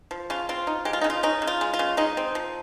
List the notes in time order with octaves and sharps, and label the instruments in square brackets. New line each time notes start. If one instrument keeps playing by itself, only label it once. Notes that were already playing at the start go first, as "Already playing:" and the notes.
[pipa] F3
C#3 F4
C4 F4
D#4
G#3 G4
F4
C#3 D#4
F4
C#4 D#4
C#3
F4
G#3
F4
C#3
G#3 D#4
C4
F3